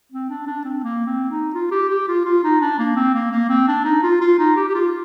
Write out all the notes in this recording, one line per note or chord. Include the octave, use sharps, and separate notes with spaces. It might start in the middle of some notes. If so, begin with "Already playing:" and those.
C4
D4
D4
C4
A#3
C4
D#4
F4
G4
G4
F4
F4
D#4
D4
A#3
C4
A#3
A#3
C4
D4
D#4
F4
F4
D#4
G4
G4
F4